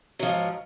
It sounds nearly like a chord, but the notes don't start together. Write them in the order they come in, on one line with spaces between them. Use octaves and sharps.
F#3 F3 G#2